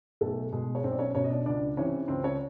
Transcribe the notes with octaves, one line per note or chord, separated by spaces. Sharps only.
B1 A3 A4
B2 G#3 G#4
C#5
B1 C4 C5
D5
C#4 C#5
B2 C#4 C#5
D#5
D4 D5
C#2 D4 D5
C3 E3 C#4 C#5
C#2 C4 C5
C#4 C#5